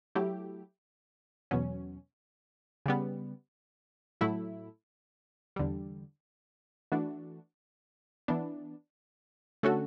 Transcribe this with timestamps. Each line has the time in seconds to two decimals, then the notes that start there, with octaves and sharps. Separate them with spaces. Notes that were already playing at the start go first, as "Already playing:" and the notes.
0.15 F#3 A3 E4 G4
1.51 E2 B2 F#3 C#4
2.86 C#3 G3 B3
4.21 A2 F#3 A3 E4
5.56 E2 D3 G3
6.92 E3 A3 D4 F#4
8.28 E3 B3 D4
9.63 D3 A3 C#4 F#4 A4